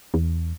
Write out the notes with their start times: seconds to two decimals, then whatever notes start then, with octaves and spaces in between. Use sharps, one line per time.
0.14 E2